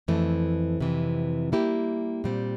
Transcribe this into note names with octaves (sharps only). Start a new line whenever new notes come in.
F2 E3 A3
F2 C3 E3
G3 A#3 E4 G4
A#2 G3 C4